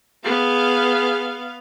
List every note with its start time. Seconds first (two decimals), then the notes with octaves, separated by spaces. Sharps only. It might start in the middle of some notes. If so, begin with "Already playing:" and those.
0.25 B3 G#4 F5